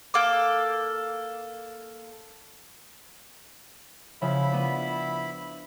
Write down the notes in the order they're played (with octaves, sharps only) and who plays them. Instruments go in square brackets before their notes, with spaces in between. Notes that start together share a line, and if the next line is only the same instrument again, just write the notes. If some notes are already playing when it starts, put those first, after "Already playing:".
[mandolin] A#3 A4 D6
[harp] C#3 F3 [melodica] E4 E5 B5
[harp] B3 D4